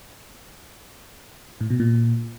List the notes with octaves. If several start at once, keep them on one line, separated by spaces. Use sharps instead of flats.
A2
B2
A#2